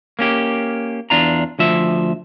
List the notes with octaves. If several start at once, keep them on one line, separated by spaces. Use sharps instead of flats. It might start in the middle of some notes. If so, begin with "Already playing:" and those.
A#3 C#4 G4
E2 D4 F4 A#5
D2 F3 E5